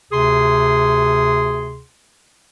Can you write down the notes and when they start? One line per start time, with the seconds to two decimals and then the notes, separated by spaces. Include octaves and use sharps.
0.12 D2 C3 G#4 C6